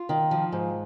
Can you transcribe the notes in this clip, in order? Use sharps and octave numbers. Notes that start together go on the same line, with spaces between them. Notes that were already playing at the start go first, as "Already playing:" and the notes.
Already playing: F4
D#3
F3
G#2